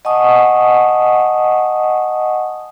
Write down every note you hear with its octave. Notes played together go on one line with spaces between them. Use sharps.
D#5 F#5 G#5 A5 C#6 D#6